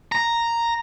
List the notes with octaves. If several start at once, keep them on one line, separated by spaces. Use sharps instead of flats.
A#5